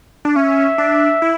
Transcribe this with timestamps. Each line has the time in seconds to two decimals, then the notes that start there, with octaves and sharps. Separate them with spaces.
0.25 D4
0.36 C#4 E5
0.78 D4
1.22 E4